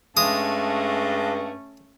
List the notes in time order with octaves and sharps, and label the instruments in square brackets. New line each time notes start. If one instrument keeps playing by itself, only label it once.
[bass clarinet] G2 [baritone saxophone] G#3 [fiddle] A3 C#4 [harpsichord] D#6